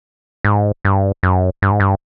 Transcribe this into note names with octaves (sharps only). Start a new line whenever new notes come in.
G#2
G2
F#2
G2
G#2
G2